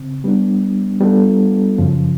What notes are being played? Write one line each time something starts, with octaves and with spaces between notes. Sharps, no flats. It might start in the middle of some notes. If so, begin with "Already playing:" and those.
Already playing: C#3 C4
G3 B3 D4
G3 B3 D4 F4 A4
F#2 C#3 F3